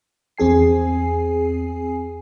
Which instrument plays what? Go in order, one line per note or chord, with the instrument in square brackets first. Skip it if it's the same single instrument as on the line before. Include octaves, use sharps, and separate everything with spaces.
[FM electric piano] E2 C4 G#4 G#5 C7